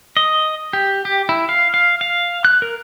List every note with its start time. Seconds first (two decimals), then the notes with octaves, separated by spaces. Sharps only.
0.17 D#5
0.73 G4
1.05 G4
1.29 E4
1.49 F5
1.74 F5
2.01 F5
2.45 F#6
2.62 A#4